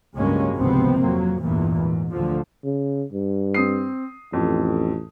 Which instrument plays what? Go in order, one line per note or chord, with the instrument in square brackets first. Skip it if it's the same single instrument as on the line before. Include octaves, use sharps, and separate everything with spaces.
[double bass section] C#2 G2 F#3 G#3 A#3 C#4
G#1 C#2 C3 F3 B3 C4
F2 F#3 A#3
A1 E2 G2 A#2 E3
G#2
D2 D3 F3
[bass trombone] C#3
G2
[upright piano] C4 D#6 C7
[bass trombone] A1 [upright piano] F2